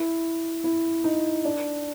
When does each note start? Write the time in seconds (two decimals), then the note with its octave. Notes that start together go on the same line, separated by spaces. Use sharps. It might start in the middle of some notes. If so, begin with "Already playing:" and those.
Already playing: E4
0.64 E4
1.04 D#4
1.45 D4